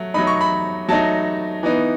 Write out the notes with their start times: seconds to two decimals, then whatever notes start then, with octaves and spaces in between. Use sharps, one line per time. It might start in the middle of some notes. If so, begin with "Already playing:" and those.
Already playing: F#3 A3
0.14 F#3 A3 D#4 B5
0.27 C#6
0.41 B5
0.88 F#3 A3 D#4 A5
1.63 E3 B3 D#4